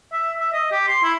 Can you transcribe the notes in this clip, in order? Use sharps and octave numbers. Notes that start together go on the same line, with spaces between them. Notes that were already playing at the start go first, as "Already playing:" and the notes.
E5
E5
D#5
G4
C6
E4